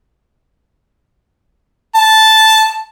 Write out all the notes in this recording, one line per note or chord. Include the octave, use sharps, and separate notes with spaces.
A5